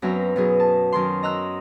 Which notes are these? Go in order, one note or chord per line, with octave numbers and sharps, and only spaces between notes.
F#2 F#3 B3 C4 E5 A#5
B2 F#3 G#4
A5
F#2 D#3 C6
D#5 A#5 E6 F#6